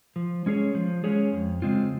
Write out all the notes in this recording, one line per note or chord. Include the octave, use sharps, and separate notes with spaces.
F3
G#3 C#4 G#4 C#5
F3
G#3 C#4 G#4 C#5
F2
C#3 G#3 C4 F4